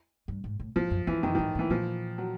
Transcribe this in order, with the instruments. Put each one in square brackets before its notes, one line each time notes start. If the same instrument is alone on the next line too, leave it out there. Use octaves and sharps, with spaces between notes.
[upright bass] G2
G#2
A2
[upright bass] G#2 [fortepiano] F3
[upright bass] F#2
[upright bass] F2 [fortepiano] E3
[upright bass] F#2 [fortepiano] D#3
[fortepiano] D#3
[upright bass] G#2
[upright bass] A2 [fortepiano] E3
[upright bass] A#2 [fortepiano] F3
[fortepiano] F#3